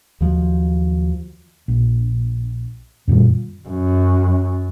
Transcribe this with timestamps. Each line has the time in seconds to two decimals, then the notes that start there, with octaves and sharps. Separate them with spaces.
0.21 D#2 F3 F#3
1.68 A#1
3.08 F#2 A#2 D#3 G3
3.69 F#2